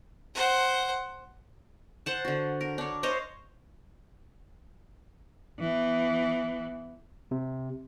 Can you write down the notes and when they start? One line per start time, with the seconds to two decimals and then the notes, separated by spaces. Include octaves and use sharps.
0.35 C5 F#5
2.06 C5 F#5 A5
2.25 D3 F#4
2.61 A#4
2.78 D4 C#5
3.03 C5 C#5 D#5 F5
5.60 E3 B3
7.31 C3